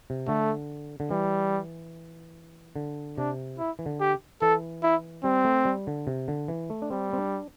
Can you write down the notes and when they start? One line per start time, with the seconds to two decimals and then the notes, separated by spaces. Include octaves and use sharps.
0.10 C3
0.27 D3 A3
1.00 D3
1.11 E3 G3
2.76 D3
3.18 C3 D4
3.58 E4
3.79 E3
3.86 D3
4.01 G4
4.42 E3 A4
4.83 E4
5.24 G3 C4
5.45 A3
5.65 G3
5.87 D3
6.07 C3
6.28 D3
6.48 E3
6.70 A3
6.82 D4
6.90 G3 C4
7.13 C4
7.18 D4